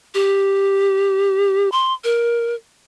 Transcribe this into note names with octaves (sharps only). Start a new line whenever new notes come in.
G4
C6
A#4